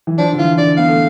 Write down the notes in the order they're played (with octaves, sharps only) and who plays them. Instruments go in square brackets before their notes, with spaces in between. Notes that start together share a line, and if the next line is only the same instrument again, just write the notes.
[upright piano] E3
[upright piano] F3 [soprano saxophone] D4
[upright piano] D3
[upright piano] E3 [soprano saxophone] F4
[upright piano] D3 [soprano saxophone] D5
[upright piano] B3 [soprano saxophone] F5
[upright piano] A3